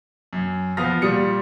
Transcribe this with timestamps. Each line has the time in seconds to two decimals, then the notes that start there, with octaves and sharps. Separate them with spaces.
0.33 F#2
0.77 F3 B3 F5 D#6 F6 A#6
1.02 A#2 G3 D#6 C#7